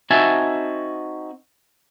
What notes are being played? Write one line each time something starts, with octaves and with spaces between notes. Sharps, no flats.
C4 D#4 F#4 E5 G#5 A5